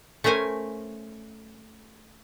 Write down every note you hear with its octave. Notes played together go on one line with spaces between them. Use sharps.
A3 C#4 A#4 C5 G#5